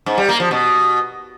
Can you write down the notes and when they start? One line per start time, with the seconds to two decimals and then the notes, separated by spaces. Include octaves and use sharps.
0.06 G#2
0.18 G3
0.29 A#3
0.40 F3
0.51 B2